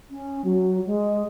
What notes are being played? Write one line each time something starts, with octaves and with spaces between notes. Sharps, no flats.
C#4
F#3
G#3